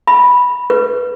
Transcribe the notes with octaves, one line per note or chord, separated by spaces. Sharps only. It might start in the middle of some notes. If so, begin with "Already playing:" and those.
B5
B4